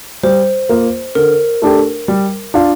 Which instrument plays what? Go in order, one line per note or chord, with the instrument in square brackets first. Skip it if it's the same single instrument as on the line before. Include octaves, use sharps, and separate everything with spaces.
[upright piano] G3 [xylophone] C5
[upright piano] A#3 F4
[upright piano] D3 [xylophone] A#4
[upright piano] A3 D4 G4
G3
D4 F4